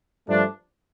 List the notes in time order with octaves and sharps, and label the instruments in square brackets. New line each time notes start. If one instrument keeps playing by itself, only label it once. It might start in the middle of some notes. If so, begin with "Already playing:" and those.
[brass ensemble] G2 F3 A3 D4